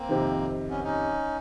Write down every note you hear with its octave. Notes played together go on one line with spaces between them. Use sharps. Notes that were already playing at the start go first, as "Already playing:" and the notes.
Already playing: A#3 C4
F2 C3 D#3
B3 C#4
C#4 D#4